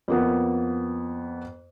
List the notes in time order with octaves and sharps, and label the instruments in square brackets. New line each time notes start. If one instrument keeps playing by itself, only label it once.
[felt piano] F2 A#3 B3